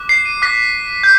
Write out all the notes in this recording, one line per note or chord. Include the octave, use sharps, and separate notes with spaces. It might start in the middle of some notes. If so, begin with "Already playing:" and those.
Already playing: D6 F#6
C7
D#7
D6 F#6 B6
G6